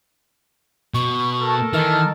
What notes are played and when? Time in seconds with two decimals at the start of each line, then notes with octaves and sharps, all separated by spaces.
0.94 B2 C#6
1.40 A4 A#4 A5
1.73 D#3 E3 F6